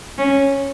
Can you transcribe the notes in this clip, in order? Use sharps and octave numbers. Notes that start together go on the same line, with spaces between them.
C#4